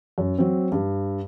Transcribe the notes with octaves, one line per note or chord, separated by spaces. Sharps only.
F#2
F#3 C4
G2